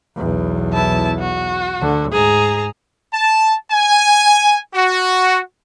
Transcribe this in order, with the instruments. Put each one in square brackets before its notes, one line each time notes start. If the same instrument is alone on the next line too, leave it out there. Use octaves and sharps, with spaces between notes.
[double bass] B1 E2
[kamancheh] E4 A5
F#4
[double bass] D2 D3
[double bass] G#2 [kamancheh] G#4 A#5
[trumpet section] A5
G#5
F#4